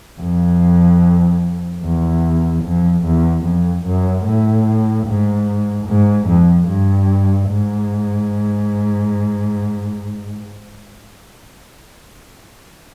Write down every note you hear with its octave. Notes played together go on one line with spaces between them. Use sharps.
F2
E2
F2
E2
F2
F#2
A2
G#2
G#2
F2
G2
G#2